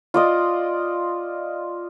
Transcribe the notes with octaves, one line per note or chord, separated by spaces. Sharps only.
F4 D5 D#5